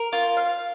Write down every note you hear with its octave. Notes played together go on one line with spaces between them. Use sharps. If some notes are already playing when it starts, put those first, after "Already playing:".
Already playing: A#4
F4
F5